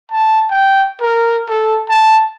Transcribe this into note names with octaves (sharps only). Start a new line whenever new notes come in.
A5
G5
A#4
A4
A5